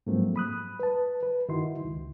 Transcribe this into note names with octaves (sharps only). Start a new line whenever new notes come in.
G#2 F3 F#3 A3 A#3 C4
B5 D#6 F#6
B4 A5
B4
G2 D#3 D#4 E4 F#4 C6
C#2